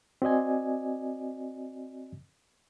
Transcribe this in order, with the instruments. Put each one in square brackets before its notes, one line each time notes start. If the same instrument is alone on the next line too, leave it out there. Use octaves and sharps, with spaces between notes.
[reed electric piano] C4 F#4 D5 D#5 G#5